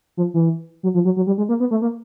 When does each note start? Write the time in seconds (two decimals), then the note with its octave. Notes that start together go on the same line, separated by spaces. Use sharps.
0.17 F3
0.34 E3
0.83 F#3
0.94 F3
1.05 F#3
1.16 F#3
1.27 G3
1.38 G#3
1.49 A#3
1.60 B3
1.71 A3
1.82 A#3